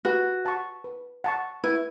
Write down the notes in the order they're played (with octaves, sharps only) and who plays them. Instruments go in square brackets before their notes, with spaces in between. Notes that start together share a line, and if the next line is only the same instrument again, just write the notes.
[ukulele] F#4 [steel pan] B4
[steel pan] F#5 A5 C#6
B4
F#5 A5 C#6
[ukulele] E4 [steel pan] B4